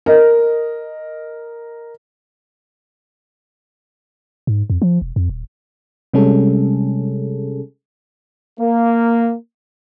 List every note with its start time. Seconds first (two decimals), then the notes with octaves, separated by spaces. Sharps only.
0.06 A#4 D#5
4.47 G#2
4.70 F2
4.82 F3
5.02 E1
5.16 F2
5.29 D#1
6.14 C3 G3 G#3 C#4 G#4 A4
8.60 A#3